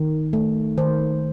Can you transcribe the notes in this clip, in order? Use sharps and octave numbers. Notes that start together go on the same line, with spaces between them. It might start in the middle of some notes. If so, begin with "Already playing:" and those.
Already playing: D#3
A3
D#3 C5